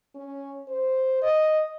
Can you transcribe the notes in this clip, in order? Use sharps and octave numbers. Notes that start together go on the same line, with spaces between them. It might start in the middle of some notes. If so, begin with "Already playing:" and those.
C#4
C5
D#5